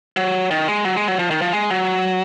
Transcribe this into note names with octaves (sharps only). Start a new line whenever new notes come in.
F#3
D#3
G#3
F#3
G#3
F#3
F3
D#3
F3
G#3
F#3